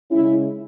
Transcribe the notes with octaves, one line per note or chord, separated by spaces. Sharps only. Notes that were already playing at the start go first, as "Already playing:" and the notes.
C#3 G#3 C#4 E4